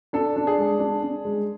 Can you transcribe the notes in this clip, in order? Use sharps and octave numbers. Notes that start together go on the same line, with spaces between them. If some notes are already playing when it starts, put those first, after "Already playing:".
D4 A4
D4
G#4
G#3
D4
D4
G#3